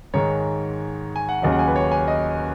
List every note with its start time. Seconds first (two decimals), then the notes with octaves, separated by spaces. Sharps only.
0.14 G#2 D#3 G#3 C#5
1.16 G#5
1.29 F#5
1.42 D#2 C#3 F#3 D#5
1.52 F#5
1.59 G#5
1.68 B4
1.76 C#5
1.91 G#5
2.08 D#5